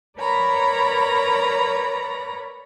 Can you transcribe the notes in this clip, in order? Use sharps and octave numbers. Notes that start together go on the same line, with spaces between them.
A#4 B4 C#5 D5 A#5 B5